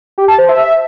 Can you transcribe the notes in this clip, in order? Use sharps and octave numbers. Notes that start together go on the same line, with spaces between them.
G4
A5
C5
E5